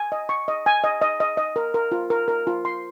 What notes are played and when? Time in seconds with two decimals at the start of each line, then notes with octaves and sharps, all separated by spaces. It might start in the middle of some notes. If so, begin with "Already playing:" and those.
Already playing: G#5
0.12 D#5
0.29 C#6
0.48 D#5
0.66 G#5
0.84 D#5
1.02 D#5
1.20 D#5
1.37 D#5
1.56 A#4
1.74 A#4
1.92 F4
2.10 A#4
2.28 A#4
2.47 F4
2.65 C6